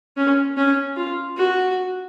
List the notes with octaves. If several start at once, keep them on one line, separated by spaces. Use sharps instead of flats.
C#4
C#4
F4
F#4